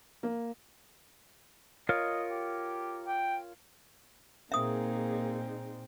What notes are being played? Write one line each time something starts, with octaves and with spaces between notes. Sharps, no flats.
A#3
F4 A#4 C#5 D#5
G4
G5
A#2 A#3 C4 D#4 G#4 E5 D#6